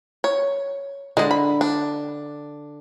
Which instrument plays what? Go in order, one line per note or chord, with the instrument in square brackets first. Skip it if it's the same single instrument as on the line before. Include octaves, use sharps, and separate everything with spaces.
[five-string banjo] C#5
[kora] D3 [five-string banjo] G#3 D#5
[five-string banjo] B5
D4